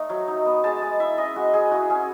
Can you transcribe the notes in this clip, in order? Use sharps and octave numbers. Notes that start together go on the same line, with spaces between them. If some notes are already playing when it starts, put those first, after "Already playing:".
Already playing: A3 D#4
F#3
D#4
B3
G#3 A5
G#3
E4 E5
C#4 D#5
G#3 F#4
G#3 G#4
E4 F#4
C#4 G#4